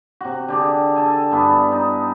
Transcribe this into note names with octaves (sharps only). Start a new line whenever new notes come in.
C3 F#4
D3 G4 G#4
A4 G#5
G2 B3 E4
D#4